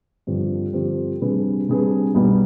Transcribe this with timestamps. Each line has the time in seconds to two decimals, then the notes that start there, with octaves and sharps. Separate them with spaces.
0.27 G2 D3 F3 C4 G4
0.73 G2 D3 F3 C4 G4
1.21 C3 G3 D4 G#4 B4
1.69 C3 G3 D4 G#4 B4
2.14 B1 B2 G3 B3 D#4